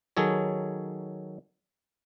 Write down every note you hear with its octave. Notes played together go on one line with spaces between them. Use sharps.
D#3 F#3 G#4 A4 C#5